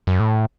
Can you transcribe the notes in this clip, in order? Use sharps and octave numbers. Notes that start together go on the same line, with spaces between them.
F#2
A2